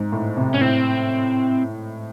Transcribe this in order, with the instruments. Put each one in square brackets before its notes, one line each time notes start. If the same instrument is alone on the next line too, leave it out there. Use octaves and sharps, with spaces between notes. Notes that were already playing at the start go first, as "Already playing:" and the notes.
Already playing: [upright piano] G#2
A2
C3
[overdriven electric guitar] C#4
[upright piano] A2 [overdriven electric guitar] C4